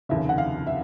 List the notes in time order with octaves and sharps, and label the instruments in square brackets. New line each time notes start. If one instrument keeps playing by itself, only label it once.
[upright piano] F1 D#2 C#3 E5
F#5
F5
E5